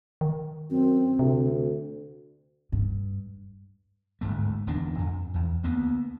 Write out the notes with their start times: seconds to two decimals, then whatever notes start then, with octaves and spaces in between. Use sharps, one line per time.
0.21 D#3
0.70 F#2 C4
1.19 D2 C3
2.72 G2
4.21 G1 D2 G#2 A3
4.67 D1 E2 D#3 D4
4.99 F2
5.34 E2
5.63 D2 A#3 B3